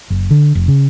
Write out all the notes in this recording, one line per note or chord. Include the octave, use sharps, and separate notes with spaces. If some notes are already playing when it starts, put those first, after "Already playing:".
F#1
D3
F1
C#3